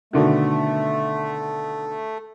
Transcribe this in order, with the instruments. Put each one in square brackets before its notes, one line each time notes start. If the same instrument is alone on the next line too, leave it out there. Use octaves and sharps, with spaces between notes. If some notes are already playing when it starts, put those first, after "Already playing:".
[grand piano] B2 D3 D#3 [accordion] A3